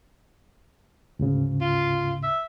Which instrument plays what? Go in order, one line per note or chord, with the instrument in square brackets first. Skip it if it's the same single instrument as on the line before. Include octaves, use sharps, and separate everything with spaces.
[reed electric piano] D2 G#2 C#3
[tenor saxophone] F4
E5